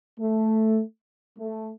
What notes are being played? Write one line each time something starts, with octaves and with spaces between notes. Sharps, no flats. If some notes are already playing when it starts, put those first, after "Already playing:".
A3
A3